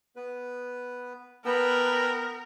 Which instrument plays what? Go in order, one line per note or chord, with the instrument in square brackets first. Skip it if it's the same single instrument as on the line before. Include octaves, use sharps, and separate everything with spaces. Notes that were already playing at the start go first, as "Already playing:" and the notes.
[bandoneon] B3 B4
[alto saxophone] B3 [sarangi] A#4 [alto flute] B4 [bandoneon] G5 A5 E6